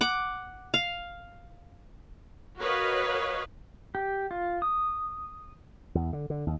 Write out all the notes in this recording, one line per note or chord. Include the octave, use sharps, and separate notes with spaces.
F#5 D6
F5
F#4 A#4 B4 C#5 D#5 F5
G4
F4
D#6
E2
D3
D3
D#2